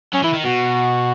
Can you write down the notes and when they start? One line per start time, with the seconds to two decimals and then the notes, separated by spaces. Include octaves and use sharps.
0.13 F#3 C#4
0.23 E3 E4
0.34 D#3
0.45 B2 F#4